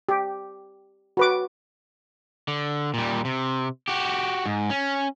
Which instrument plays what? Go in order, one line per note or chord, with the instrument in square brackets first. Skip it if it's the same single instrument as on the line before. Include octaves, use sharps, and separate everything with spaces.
[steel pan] G4
F#4 B4 D6
[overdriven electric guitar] D3
A#2 G3
C3
F#4 G4
G#2
C#4